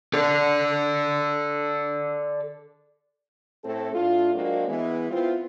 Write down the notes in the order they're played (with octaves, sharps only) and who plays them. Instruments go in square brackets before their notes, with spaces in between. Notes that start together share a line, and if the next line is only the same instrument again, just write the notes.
[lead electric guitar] A4 D5
[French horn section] A2 A3 C4 A4
A2 A3 D4 F4
F#3 G#3 A#3 C4 D4 F#4
E3 G#3 B3
B3 C4 E4 F4